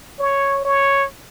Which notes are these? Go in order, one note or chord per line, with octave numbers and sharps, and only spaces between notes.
C#5
C#5